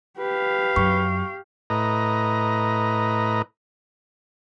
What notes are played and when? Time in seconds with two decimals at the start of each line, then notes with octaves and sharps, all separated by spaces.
0.19 G4 B4 F5
0.76 F#2 C#6
1.70 A2 B4 D#5 A#5